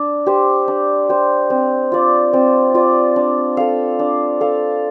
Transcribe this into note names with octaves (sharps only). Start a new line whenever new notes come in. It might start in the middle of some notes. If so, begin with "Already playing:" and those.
Already playing: D4
G4 C5
D4
G4 C5
C4
F4 D5
C4
F4 D5
D4
A4 F5
D4
A4 F5